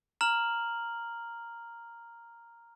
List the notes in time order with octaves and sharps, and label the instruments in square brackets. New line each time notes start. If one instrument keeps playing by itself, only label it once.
[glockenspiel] A#5 F6 F#7